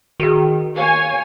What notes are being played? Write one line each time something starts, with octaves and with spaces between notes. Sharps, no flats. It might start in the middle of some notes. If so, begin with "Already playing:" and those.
D#3 F#4 G#4
C#5 F5 G#5